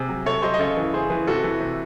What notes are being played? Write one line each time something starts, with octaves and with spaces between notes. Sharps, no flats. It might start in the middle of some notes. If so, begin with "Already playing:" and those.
Already playing: C3 G#4
F#3
C3 A4 C#5
F#3 C5 D#5
D#5
C#3 A4 C#5
E3
C#3 G#4 C5
E3
C3 F#4 A4
E3
C3